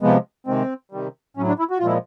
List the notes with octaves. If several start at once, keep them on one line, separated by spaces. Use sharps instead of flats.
C3 F3 G#3 B3
C3 D#3 G#3 C4
C3 D#3 G3
A2 F#3 C#4
D4
E4
F#4
F4
A#2 F3 G#3 E4